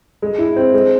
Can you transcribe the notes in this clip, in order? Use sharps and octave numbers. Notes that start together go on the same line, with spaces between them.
G#3
E4
C4
G#3